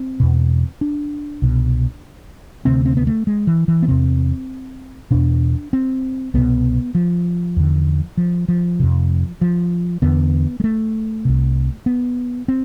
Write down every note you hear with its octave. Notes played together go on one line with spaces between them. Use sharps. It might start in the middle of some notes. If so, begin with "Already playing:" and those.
Already playing: C4
E2 B2
D4
C2 B2
D2 C3 C4
C4
B3
A3
G#3
E3
E3
B3
E2 C3 C4
E2 B2 D4
C4
C2 B2 B3
F3
E2 D3
F3
F3
F2 C3
F3
E2 D3 B3
G#3
A3
C2 C3
B3
C4